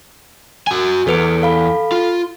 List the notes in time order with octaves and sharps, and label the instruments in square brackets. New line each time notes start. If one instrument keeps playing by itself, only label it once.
[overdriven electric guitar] F#4 G#5
[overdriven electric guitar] E2 [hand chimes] A4 B4 D7
[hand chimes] A4 F5 B5
[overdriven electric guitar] F4